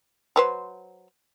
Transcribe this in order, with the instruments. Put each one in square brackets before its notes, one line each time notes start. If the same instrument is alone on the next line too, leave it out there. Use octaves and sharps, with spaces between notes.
[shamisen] F#3 B4 C5